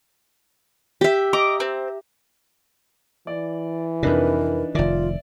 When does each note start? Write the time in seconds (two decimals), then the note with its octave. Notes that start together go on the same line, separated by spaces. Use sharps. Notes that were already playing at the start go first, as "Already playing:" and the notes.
1.01 G4 E5
1.33 D#5 A#5 D6
1.60 C4
3.27 E3 D5
4.03 F2 C3 D4 D#4 A#4 B4
4.75 F1 D#3 F4 D5 E5